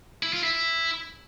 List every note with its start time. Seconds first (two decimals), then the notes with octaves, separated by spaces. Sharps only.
0.23 E4
0.33 F4
0.43 E4